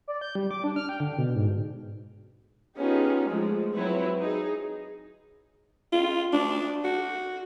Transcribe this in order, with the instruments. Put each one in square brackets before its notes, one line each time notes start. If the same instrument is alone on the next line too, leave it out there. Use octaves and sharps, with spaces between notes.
[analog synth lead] D5
G6
G3
D6
D4
F6
G5
D3
B2
G#2
[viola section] B3 C#4 D#4 F4 G4 G#4
F3 G#3 A3
F#3 C4 E4 B4 C#5
D#4 G#4
[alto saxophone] F4
D4
F#4